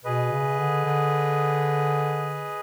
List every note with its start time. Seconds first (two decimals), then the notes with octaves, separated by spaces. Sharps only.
0.04 B2 G#4 B4 D#5
0.32 C#3
0.59 D3
0.85 D3